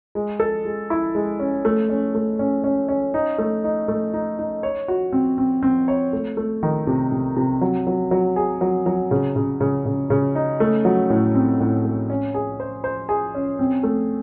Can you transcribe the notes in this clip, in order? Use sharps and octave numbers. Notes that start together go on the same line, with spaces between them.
G#3
A4
G#3
E4
G#3
C#4
A3
C#4
A3
C#4
C#4
C#4
D#4
A3
D#4
A3
D#4
D#4
C#5
F#4
C4
C4
C4
C#5
A3
A3
D#3
C3
C3
C3
F#3
F#3
F#3
G#4
F#3
F#3
C#3
C#3
C#3
C#3
C#3
D#4
A3
F#3
A2
C4
A2
A3
C#4
G#4
C5
C5
G#4
C#4
C4
A3